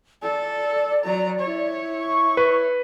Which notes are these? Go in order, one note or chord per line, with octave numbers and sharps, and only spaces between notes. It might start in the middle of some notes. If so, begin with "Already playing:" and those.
A4 D5
F#3 A#5
E4 C#5
C#6
B4